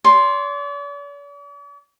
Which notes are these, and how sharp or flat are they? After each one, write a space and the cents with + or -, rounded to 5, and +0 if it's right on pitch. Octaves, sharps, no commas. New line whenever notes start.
D5 -45 C6 +0